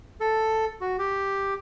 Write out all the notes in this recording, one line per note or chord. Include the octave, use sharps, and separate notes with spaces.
A4
F#4
G4